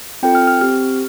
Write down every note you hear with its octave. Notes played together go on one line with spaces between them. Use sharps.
C4 F4 A4 G5
F6
F6
C4 G4 F6